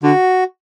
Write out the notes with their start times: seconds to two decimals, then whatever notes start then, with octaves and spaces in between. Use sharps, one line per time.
0.03 D3 F#4